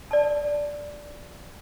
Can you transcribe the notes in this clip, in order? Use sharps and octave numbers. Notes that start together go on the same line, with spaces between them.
D5 A5